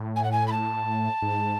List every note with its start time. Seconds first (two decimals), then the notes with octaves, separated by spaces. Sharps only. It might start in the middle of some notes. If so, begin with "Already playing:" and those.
Already playing: A2
0.16 G#5
0.23 F#5
0.32 G#5
0.47 B5
0.51 A5
1.22 G#2